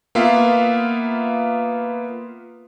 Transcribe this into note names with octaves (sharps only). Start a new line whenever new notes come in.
A#3 B3 F4 E5 F5